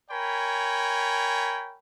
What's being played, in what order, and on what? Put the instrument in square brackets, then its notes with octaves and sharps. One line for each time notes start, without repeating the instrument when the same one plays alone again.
[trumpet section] A#4 C#5 G5 G#5 B5